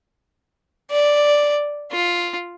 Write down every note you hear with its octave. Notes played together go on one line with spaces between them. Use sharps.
D5
F4